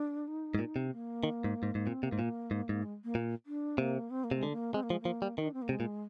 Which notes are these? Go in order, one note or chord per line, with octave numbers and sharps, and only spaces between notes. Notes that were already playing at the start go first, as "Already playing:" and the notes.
Already playing: D4
D#4
G#2
A#2
C3
A#3
D#3
G#2
G#2
G#2
A#2 C4
C3 A#3
G#2
A#2
G#2
G#2
G#3
A#3
A#2
D4
C3 A#3
C4
A#3
C3
G#3
D3
A#3
G#3 C4
A#3
F3 G#3
F3 A#3
G3
D#3 D#4
D4
C4
A#3
C3 G#3
A#2